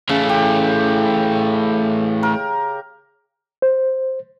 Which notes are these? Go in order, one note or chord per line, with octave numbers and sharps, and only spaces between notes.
C#3 E3 A3
G4
A#4
C5